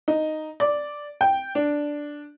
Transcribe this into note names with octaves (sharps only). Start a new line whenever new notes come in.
D#4
D5
G5
D4